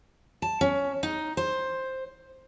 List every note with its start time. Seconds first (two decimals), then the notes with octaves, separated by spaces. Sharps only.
0.42 A5
0.61 C#4
1.03 D#4
1.37 C5